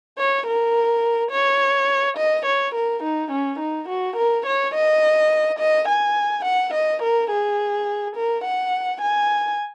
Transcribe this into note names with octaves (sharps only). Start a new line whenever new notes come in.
C#5
A#4
C#5
D#5
C#5
A#4
D#4
C#4
D#4
F#4
A#4
C#5
D#5
D#5
G#5
F#5
D#5
A#4
G#4
A#4
F#5
G#5